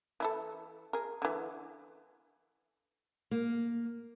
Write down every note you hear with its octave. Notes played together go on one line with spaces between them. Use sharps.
E3 E4 A4
G#4 A#4
D3 E3
A#3